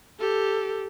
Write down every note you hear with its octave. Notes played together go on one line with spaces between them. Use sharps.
G4 A4